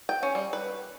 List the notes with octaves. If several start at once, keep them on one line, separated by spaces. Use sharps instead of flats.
G5
C#4
G3
B4